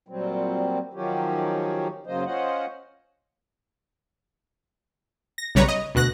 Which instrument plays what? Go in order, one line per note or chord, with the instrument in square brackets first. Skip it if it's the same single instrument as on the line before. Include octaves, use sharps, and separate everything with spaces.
[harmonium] A#2 F#3 G3 C4
D#3 F3 F#3 C#4 G4
F#2 C#3 F#3 A#3 C5 D#5
C#4 F4 C5 D#5 F#5
[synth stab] A#6
B1 C#3 G3 B4 C#5 A#5
D#5
D2 B2 F#6 A#6